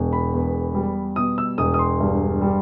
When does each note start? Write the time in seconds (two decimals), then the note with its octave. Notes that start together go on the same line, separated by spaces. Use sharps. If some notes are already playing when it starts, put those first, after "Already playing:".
Already playing: E1 B2
0.13 B5
0.34 E2
0.75 G3
1.16 B2 D#6
1.38 E6
1.58 E1 D#6
1.74 D#6
1.79 C6
2.00 G2
2.41 G3